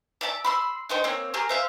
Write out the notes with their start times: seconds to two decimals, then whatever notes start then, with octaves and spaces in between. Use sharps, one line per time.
0.21 D5 E5 G#5 A5
0.45 B5 C6 E6
0.89 D4 D#4 C5 G5
1.04 A#3 C4 C#5
1.34 G4 G#4 A#4 F6
1.49 C5 E5 F5